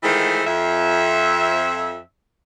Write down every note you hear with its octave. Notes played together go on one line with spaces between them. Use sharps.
D#3 E3 G#3 A3 F4 C5
F2 E5